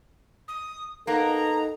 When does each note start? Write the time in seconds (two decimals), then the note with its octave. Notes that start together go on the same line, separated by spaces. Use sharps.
0.48 D#6
1.07 A#3 B3 D#4 A4 A#5